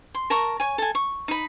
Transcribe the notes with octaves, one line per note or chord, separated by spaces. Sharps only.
C6
A#4 A5 A#5 C#6
C#5 G#5
A4 G#5
C#6
D#4 B5